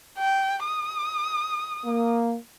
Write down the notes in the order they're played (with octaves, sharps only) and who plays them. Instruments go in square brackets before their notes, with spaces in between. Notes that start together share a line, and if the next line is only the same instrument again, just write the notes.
[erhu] G5
D#6
[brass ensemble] A#3